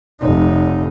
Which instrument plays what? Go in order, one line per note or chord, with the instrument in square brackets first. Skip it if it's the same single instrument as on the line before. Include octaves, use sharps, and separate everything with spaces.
[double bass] F1 D#4